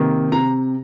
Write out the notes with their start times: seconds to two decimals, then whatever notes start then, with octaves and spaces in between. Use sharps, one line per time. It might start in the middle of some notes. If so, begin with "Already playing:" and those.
Already playing: C3 D#3 A#3
0.32 C3 A#5